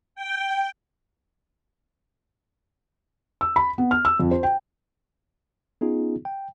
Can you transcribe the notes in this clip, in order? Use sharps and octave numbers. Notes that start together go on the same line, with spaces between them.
G5
E6
B5
B3
F6
E6
F2
C5
G5
B3 C#4 D#4 F4 G#4
G5